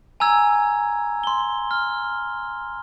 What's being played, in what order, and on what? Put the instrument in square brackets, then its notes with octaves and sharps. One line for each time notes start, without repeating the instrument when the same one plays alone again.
[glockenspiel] G#5 A#5 E6 G#6
C6 G7
F6